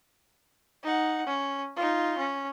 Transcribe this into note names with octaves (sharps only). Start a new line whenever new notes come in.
D#4 F#5
C#4
D#4 F4
C#4